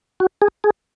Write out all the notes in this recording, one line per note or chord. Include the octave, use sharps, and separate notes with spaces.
F#4
G#4
G#4